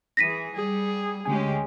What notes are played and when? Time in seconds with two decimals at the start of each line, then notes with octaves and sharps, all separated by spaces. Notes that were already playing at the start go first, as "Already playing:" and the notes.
0.17 E3 G#4 A#6 B6 D#7
0.56 G3 G#4
1.25 D2 G#3 C#4 G4 G#5